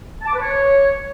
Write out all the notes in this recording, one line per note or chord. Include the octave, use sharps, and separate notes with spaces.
A5
D6
B4
C#5